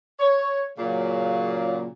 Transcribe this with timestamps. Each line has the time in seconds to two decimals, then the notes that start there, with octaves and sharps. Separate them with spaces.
0.20 C#5
0.78 A#2 C#3 F#3